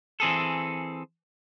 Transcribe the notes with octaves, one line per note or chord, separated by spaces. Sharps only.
E3 C4 G#4 A4